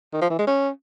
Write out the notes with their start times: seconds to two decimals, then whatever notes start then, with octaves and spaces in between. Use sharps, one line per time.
0.13 D#3
0.22 F3
0.30 E3
0.39 G#3
0.47 C#4